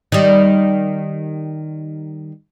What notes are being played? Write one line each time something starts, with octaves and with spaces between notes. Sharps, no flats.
D#3 G3